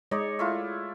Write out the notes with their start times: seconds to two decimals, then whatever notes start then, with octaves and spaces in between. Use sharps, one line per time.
0.11 G#3 D#4 C#5 D5
0.39 A3 E4 F4